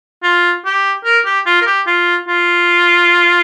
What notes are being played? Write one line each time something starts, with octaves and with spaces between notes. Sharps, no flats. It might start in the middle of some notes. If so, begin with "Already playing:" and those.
F4
G4
A#4
G4
F4
A#4
G4
F4
F4